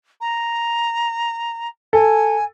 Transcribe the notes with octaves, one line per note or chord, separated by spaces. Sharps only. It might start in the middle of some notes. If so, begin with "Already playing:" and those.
A#5
A4 G#5